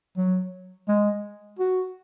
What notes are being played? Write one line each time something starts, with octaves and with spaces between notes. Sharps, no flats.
F#3
G#3
F#4